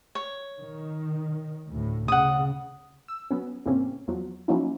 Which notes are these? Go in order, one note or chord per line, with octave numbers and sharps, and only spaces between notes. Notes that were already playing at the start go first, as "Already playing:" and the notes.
C#5
D#3
D2 A2
C#3 F#5 D#6
E6
F#3 B3 C#4
E2 G#2 C3 A#3 C4 C#4
E2 F3 F#3
F3 F#3 A#3 C#4 D#4 E4